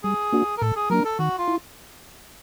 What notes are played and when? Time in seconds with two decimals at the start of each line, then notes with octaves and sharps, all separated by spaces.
0.03 G3 G#4
0.32 A#3 D4 F#4
0.57 A#4
0.61 A2 A4
0.76 G#4
0.90 F#3 A#3 D4 A#4
1.05 A4
1.19 D#3 F#4
1.38 F4
1.48 E4